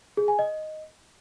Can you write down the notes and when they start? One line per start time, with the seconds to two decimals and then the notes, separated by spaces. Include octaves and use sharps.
0.17 G#4
0.28 G#5
0.39 D#5